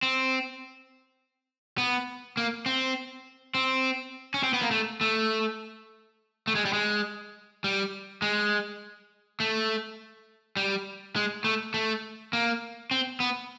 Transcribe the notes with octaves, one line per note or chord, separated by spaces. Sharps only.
C4
B3
A#3
C4
C4
C#4
C4
B3
A#3
A3
A3
A3
G#3
G3
G#3
G3
G#3
A3
G3
G#3
A3
A3
A#3
C4
B3